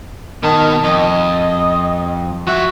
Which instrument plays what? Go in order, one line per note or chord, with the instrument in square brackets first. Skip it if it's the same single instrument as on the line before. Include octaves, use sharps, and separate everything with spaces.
[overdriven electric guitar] B2 A5 [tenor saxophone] D#3
[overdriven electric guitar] F2 [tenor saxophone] D#5
[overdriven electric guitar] F3 E5 [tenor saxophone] F#4